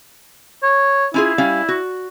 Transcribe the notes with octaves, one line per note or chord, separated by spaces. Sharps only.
C#5
C#4 E4 F4 G#4
G3 C#4 F5
F#4